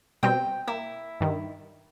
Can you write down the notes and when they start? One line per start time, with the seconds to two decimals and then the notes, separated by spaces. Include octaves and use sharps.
0.23 B2 G3 C4 G5
0.68 A#3 E4
1.20 G2 D#3